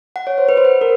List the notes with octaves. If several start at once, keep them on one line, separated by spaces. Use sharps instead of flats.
F#5
C#5
C5
B4
C5
B4
A#4